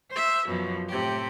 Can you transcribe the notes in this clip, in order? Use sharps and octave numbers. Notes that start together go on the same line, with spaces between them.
C5 E5
F#2 B2 F3
A2 C3 G4